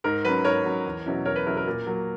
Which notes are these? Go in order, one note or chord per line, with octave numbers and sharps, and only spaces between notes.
G#2 A#4
F#3 C#4 B4
G#2 A#4 C#5
F#3 C#4
E2
B2 F#3 C#4 E4
E2 A#4 C#5
B4
B2 F#3 C#4 E4 A#4
A#4
A#2
F#3 A#3